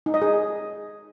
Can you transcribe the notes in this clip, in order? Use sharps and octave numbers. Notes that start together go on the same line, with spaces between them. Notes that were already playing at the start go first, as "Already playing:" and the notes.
D#4
D#5
G#4